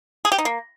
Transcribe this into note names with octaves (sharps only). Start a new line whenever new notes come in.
G#4
G4
D#4
A#3